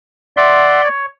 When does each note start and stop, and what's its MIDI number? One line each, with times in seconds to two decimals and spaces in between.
0.37 0.88 74
0.37 0.81 76
0.37 0.81 78
0.37 0.81 84
0.84 1.06 73